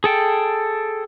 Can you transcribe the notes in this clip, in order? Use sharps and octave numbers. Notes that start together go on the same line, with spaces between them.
G#4 A4 G5